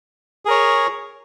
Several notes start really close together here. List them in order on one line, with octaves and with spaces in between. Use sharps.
G#4 A#4 C#5